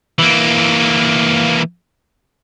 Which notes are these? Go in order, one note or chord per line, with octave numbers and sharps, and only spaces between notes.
E3 A#3